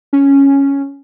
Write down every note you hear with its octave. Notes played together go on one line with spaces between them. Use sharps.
C#4